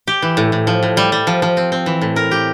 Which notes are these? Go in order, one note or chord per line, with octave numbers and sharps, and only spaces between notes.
G4
E3
A2
A2
F3
A2
G3
G3
F3
F3
C4
C4
E3
A2
A#4
G4